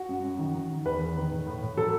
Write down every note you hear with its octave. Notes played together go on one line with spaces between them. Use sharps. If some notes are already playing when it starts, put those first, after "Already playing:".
Already playing: F#4
F#2
F#2
D#3
D#3
D#3
E2 B4
E2
D#3
A2
A2
A2
F#3 A4